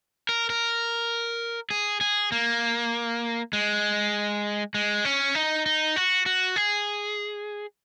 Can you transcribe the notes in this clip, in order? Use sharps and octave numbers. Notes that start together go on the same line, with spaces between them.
A#4
A#4
G#4
G#4
A#3
G#3
G#3
C#4
D#4
D#4
F#4
F#4
G#4